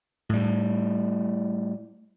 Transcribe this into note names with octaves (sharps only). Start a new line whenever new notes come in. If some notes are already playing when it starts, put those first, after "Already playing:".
A2 G3